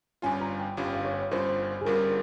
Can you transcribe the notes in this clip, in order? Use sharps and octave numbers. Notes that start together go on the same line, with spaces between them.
G1 G2 G3 C#4 F4 G#5
A#5
G5
G1 G2 G3 C#4 F4 F5
G5
F5
C#5
G1 G2 G3 C#4 F4 C5
G#4
G1 G2 G3 C#4 F4 A#4